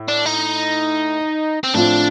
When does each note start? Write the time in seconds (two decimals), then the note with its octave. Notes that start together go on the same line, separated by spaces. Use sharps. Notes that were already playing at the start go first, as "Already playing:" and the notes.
Already playing: A2
0.08 D4
0.26 D#4
1.64 C4
1.74 A2 F3 C4 D4 F4